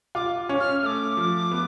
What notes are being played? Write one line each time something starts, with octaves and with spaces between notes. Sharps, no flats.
F4 D6
C#4
F6
A3 D6 F6
F3
B3